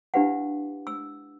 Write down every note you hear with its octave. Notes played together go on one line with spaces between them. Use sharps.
D4 E4 G4 B4 F5 F#5
E6